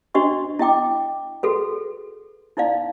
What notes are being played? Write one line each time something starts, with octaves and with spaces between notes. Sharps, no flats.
D4 F#4 C5 D#5 C#6
E4 D#5 G5 D6
F#4 G#4 A4 B4
D#4 E4 C5 D5 F5